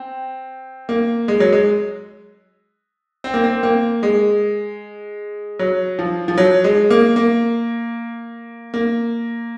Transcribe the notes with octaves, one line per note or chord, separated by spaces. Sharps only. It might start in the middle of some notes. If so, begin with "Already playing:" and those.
Already playing: C4
A#3
G#3
F#3
G#3
C4
A#3
C4
A#3
G#3
F#3
F3
F3
F#3
G#3
A#3
A#3
A#3